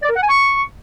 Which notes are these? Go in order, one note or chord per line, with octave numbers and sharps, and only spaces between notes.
D5
A#4
F#5
G#5
C#6